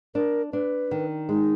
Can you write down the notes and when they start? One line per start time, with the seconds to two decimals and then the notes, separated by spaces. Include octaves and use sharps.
0.15 D4 A#4
0.53 D4 B4
0.91 D#3
1.29 G#3 D#4